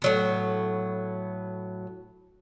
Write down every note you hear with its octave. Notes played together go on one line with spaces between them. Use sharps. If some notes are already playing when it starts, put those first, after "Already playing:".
A2 F#3 B3